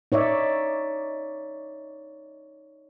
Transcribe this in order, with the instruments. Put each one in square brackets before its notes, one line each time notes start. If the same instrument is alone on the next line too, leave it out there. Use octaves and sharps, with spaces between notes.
[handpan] D#4 C#5 D5 E5